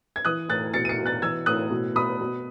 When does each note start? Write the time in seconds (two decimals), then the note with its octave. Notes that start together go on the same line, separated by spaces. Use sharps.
0.16 G#6
0.25 E3 D#6 F#6
0.49 A2 F#6 A6
0.74 B2 A6 C#7
0.85 D#7
0.89 A6 C#7
0.99 B2
1.06 F#6 A6
1.22 E3 E6 G#6
1.46 A2 D#6 F#6
1.71 B2
1.95 B2 B5 D#6
2.21 B2